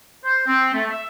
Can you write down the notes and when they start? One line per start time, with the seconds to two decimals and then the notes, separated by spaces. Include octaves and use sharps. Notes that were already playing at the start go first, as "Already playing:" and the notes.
0.24 C5
0.47 C4
0.73 A3
0.90 E5